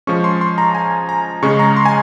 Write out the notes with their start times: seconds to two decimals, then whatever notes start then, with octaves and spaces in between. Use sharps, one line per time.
0.07 F3 G#3 C#4 C#6
0.24 C6
0.41 C6
0.58 A#5
0.75 G#5
1.09 A#5
1.43 C#3 G#3 C#4 C#6
1.59 A#5
1.76 C6
1.85 G#5